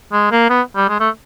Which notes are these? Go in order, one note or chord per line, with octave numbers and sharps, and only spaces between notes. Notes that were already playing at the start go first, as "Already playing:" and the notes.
G#3
A#3
B3
G3
G#3
A3